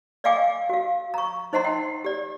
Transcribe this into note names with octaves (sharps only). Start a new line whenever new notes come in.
D5 D#5 F5 G5 G#5 D6
F#4 F5
A#5 C#6
D#4 C5 D#5 F#5 A#5 C6
G5
G4 D5